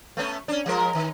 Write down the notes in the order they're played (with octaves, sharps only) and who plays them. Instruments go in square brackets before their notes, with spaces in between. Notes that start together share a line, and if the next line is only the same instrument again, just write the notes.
[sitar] A3 B3 C#4
C#4 D4
F3 G#3 A#4
D#3